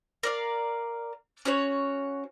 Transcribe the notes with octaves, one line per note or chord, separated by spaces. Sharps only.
A#4 D5 F5
C#4 F#4 C#5